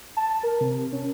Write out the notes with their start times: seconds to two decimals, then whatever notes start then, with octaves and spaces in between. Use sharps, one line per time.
0.17 A5
0.43 A#4
0.61 C3
0.93 C#4